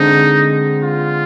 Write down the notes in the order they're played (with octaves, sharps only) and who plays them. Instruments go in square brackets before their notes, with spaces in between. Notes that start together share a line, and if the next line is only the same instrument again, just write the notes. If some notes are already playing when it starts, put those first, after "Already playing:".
Already playing: [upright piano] D3 G#3 C4 [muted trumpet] D#4
[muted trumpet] F4